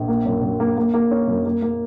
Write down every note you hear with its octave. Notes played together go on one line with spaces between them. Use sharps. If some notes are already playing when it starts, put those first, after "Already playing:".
Already playing: A#1
A#3
F#2
F#2
A#3
A#3
A#3
C#4
F#2
A#3
A#3